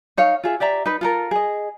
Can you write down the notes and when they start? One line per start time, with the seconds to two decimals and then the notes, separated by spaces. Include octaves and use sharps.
0.17 D#4 C#5 F5
0.44 F4 G#4 E5
0.60 G4 D5 E5 A#5
0.86 D#4 B4
1.01 F4 A4 A#4
1.31 G#4 D#5